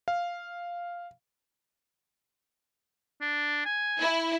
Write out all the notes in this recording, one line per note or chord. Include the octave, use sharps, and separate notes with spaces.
F5
D4
G#5
E4